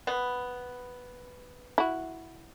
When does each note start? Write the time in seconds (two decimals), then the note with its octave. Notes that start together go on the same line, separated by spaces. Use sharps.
0.07 B3
1.78 E4 F#4